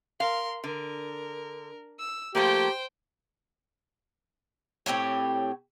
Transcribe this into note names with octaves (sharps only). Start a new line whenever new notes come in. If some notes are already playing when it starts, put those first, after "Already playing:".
A#4 F5 C6
D3 A#4
E6
F3 A3 A#3 G4 C5 G5
A2 C4 G4 C#5